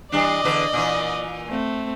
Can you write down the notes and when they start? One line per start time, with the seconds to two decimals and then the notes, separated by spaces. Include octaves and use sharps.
0.12 E3 G3 D4 D5 D#5
0.44 E2 D3 B4
0.73 A#2 E3
1.49 A3 C4